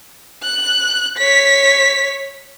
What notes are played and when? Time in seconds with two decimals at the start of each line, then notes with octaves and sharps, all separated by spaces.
0.43 F#6
1.18 C#5 B6